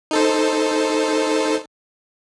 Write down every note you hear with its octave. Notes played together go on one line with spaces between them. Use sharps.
D#4 A4 C5